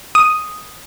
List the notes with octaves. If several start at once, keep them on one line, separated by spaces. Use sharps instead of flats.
D#6